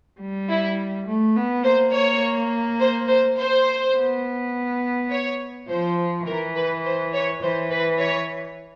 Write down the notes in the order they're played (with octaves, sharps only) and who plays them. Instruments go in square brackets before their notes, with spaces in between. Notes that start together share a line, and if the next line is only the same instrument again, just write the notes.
[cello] G3
[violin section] E4
[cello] A3
B3
[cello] A#3 [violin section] C5
[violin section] C#5
C5
C5
C5
[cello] B3
[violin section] C#5
[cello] F3 [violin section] C5
[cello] E3 [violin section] A#4
[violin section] B4
C5
C#5
[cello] E3 [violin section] C5
[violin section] B4
C#5